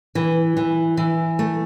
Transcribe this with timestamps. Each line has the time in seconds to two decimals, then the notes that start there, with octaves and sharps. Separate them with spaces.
0.15 E3
0.57 E3
0.97 E3
1.39 A3